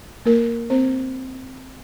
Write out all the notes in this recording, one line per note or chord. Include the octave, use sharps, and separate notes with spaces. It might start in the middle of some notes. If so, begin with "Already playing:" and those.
A#3 A#4
C4 C5